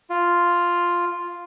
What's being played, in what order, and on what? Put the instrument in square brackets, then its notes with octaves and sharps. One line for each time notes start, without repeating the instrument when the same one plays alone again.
[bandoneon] F4